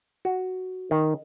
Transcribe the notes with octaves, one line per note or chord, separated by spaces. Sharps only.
F#4
D#3